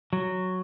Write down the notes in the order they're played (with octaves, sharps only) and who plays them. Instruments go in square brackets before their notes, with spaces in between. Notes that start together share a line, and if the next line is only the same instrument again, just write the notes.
[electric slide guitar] F#3